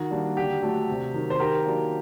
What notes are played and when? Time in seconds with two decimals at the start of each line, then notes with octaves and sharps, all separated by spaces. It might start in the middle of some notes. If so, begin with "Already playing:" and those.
Already playing: D#3 F#4
0.11 G3 A#3 D4
0.36 D3 G4
0.62 F#3 A3 D4
0.89 C3
1.14 D#3 F#3
1.30 C5
1.39 D#3 G4 A#4
1.66 F#3 A#3 D4